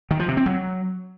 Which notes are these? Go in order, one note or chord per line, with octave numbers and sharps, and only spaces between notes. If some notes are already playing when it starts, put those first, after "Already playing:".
D#3
F3
C3
C4
F#3